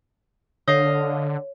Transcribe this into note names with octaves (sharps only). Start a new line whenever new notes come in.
D3 C#5 D#5 F5